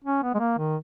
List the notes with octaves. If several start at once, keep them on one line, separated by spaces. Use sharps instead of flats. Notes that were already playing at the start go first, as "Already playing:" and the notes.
C#4
B3
G#3
A#3
D#3